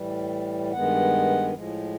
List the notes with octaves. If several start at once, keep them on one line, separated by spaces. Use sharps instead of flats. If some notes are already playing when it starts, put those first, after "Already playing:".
Already playing: A2 E3 G3
G2 D#3 G#3 B3 F#5
A2 F3 G#3